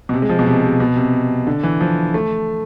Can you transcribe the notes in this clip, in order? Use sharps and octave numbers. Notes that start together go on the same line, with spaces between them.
B2
C3
G#3
F3
B2
C3
C3
B2
C3
D3
E3
F3
A3